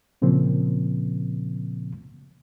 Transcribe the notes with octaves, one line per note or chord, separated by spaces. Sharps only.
A#2 C#3 F3 A#3 C4